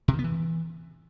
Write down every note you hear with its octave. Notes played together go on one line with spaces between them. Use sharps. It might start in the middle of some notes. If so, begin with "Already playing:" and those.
C3
D#3
B3
E3